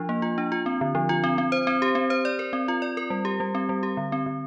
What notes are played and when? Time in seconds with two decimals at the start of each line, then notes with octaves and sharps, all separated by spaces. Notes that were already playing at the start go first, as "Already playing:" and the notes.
Already playing: F3 D4 F4
0.09 A#3
0.22 F4
0.38 D4
0.52 F4
0.66 C4
0.81 D3
0.95 F3
1.09 F4
1.24 C4
1.38 C4
1.52 C5
1.67 C4
1.82 G4
1.95 C4
2.10 C5
2.25 D5
2.39 A#4
2.53 C4
2.68 F4
2.82 D5
2.97 A#4
3.10 G3
3.25 G4
3.40 G3
3.55 C4
3.69 G3
3.83 G4
3.97 D3
4.12 C4
4.26 D3